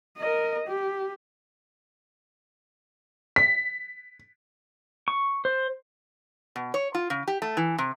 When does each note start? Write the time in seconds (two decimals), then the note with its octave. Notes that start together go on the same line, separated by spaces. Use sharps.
0.18 A#4 D#5
0.68 G4
3.36 B6
5.08 C#6
5.45 C5
6.56 B2
6.74 C#5
6.95 F4
7.10 C#3
7.28 G4
7.42 A3
7.57 E3
7.78 C3